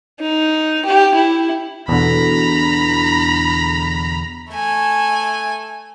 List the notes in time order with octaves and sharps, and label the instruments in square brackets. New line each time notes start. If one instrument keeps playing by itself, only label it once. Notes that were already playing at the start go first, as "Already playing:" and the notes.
[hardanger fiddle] D#4
G4
E4
[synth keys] E2 B2 D3 [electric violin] A#5 B5
[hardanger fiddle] A3 G#5